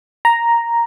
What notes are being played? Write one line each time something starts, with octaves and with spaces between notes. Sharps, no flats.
A#5